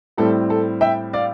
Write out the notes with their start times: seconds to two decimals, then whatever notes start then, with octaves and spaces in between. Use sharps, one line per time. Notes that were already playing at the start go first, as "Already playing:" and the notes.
0.18 A2 G3 C4 E4 A4
0.50 A4
0.81 E5 G5
1.13 D5 F5